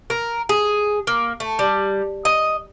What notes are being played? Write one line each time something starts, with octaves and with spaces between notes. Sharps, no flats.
A#4
G#4
A#3
A3
G3
D#5